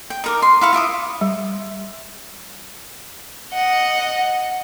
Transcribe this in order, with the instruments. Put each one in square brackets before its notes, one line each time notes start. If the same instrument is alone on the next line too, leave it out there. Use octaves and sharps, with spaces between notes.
[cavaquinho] G5
D#4 A#4 D6
C6
E4 F5 C#6
F4 E5 D6 D#6
[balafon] G3
[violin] D#5 F#5